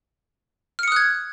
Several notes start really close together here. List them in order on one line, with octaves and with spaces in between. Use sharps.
F6 C#7 D#6 F#6 G#6